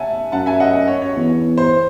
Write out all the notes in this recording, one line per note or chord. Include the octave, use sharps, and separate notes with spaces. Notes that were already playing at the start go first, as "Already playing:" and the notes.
Already playing: E5 F#5 G#5 A5
F#2 F#5 A5
E5 G#5
D#5 F#5
C#5
C#5
E2
C5